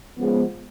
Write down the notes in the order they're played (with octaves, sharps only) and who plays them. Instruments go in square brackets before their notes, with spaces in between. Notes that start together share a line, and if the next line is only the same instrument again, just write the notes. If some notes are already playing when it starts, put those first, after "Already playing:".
[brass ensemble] C#3 F3 G#3 B3